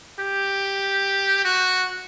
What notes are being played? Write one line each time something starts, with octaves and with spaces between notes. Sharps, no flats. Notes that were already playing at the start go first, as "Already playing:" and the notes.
G4
F#4